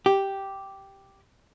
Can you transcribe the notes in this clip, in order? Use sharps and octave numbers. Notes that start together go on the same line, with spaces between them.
G4